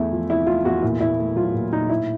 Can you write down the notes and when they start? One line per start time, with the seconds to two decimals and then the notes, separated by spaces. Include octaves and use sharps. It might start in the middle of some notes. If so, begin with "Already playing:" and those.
Already playing: E2 A3 E4
0.12 F3
0.29 C3 E4
0.47 A3 F4
0.65 E2 F#4
0.82 A#2 E4
1.00 A#2 E4
1.19 A3
1.36 F#3 F4
1.54 A#2
1.72 A#2 D#4
1.90 A2 E4